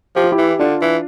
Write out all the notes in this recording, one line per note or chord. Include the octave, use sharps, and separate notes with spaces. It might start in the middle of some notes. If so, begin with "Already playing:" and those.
F3 G4
F4
E4 G4
E3
D3 D4 F4
E3